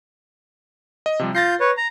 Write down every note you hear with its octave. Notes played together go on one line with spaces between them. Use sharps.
D#5
C3 F3 G3
F4 G6 A6 A#6 C7
B4 C#5
A#5